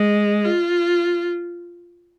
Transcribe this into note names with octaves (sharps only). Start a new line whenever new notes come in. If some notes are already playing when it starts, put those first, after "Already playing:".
Already playing: G#3
F4